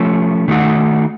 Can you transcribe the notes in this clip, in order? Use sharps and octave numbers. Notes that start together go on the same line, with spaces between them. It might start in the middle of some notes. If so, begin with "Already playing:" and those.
Already playing: F3 A3 C#4
D#3 A3 D#4 F#4